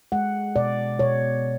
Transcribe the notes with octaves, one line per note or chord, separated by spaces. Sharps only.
G#3 F#5
B2 D5
B2 C#5